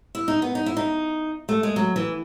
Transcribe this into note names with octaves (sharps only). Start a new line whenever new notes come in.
E4
D#4
B3
D#4
E4
D#4
A3
G#3
F#3
E3